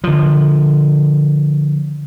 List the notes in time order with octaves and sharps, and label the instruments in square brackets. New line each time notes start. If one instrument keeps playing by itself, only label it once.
[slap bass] D3 F3